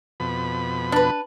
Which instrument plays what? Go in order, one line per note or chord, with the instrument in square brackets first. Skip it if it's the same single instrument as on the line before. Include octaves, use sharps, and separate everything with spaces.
[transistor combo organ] F2 B2 B5
[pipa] D4 B4